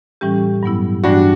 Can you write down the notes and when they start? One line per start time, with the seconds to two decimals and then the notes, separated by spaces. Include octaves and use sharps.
0.21 A2 E3 G3 C#4 G4
0.63 G2 F#3 B3 E4
1.04 G2 E3 G3 D4 F#4